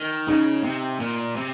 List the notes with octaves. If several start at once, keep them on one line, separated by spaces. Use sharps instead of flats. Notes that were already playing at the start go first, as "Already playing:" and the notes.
Already playing: D#3
C#3 D#4
C3
A#2
C3